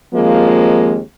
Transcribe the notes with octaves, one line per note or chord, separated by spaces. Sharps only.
D#2 F3 G#3 A#3 C4